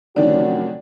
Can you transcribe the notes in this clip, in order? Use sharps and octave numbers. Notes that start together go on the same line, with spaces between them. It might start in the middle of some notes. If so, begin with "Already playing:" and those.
F1 F#2 D3 D#3 C#4 D4 F#4 D5